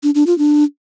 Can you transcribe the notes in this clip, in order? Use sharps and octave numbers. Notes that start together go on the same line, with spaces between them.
D4
D4
F4
D4